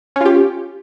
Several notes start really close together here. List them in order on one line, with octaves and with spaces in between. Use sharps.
C#4 F4 G4